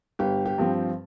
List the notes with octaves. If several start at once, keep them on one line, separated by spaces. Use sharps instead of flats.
G1 G4
G4
G2 F3 C4